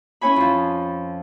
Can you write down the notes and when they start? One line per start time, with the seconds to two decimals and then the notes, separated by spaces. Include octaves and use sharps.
0.21 C#4 E4 C#5 G#5 B5
0.36 F2 F3